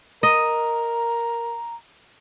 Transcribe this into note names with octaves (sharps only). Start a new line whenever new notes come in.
A#4 D#5 A#5